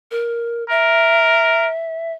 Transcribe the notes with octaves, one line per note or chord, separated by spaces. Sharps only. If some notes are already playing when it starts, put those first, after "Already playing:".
A#4
A#4 E5